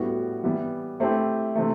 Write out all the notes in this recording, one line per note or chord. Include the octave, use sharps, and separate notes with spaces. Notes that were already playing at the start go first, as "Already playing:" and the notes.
Already playing: A2 G3 B3 F#4
E3 G3 B3
A3 C4 E4 G4
C3 E3 A3